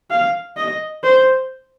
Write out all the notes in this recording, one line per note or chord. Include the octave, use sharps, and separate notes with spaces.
F5
D#5
C5